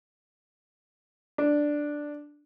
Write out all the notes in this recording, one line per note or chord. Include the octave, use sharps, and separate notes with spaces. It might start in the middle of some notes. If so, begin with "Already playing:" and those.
D4